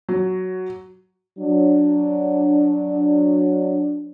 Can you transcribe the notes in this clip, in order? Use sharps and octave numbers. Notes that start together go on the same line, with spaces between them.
F#3
F#3 D4